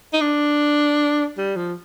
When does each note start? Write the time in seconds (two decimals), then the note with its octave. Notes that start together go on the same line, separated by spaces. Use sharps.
0.13 D#4
0.21 D4
1.38 G3
1.56 F3